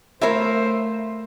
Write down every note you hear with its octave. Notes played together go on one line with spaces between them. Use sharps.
A3 A#4 C5 C#5 E5 F5 B5